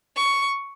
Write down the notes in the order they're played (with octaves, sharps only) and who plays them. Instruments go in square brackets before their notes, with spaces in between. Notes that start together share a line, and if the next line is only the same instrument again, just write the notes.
[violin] C#6